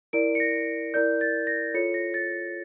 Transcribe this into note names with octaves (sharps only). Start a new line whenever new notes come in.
E4 A#4 D5 D7
C#7
A#6
E4 A#4 D5 G6
A6
A#6
F4 A4 C#5 C#7
A#6
A6